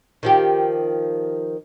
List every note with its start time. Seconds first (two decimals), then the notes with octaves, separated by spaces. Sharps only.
0.23 D#3 F3 G4